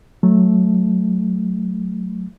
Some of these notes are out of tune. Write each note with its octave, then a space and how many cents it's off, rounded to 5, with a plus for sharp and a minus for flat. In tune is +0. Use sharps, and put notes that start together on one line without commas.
F#3 -5 A3 -10